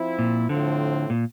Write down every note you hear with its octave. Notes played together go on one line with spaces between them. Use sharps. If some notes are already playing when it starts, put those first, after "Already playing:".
Already playing: F3 C4 E4
A#2
A2 D3 F3 C4
A#2